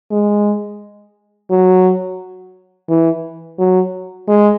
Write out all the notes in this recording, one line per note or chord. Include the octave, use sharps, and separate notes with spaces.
G#3
F#3
E3
F#3
G#3